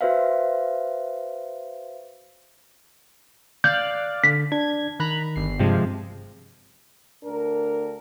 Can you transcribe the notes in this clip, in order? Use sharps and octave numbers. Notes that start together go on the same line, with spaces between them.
F#4 B4 C5 E5 F5
D5 F5 F#6 G6
D3 B6
D4 G#6
D#3 A#5 B5 F#6
G1 C7
G2 C3 F3 G#3
D2 D4 A#4